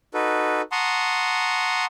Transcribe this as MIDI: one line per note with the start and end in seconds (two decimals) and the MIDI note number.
0.14 0.61 63
0.14 0.61 66
0.14 0.61 69
0.14 0.61 71
0.72 1.85 78
0.72 1.85 81
0.72 1.85 82
0.72 1.85 84
0.72 1.85 85
0.72 1.85 87